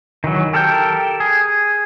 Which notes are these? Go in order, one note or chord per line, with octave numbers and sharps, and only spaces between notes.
D#3 E3 F#3
G4 A4 A#4 D5 G5
G#4